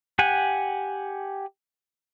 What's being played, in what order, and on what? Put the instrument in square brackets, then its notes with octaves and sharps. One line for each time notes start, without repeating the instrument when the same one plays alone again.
[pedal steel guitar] G4 F#5 G#5